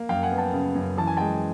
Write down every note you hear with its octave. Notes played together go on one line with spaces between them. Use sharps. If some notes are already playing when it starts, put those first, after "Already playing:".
Already playing: A#3
F#2 F5 G5
F#5 G#5
B3
G5 A5
C#3
F#2
E3 A5
G#5
G#3 G5 A5